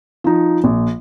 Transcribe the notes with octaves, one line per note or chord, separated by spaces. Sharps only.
F3 D#4
A#1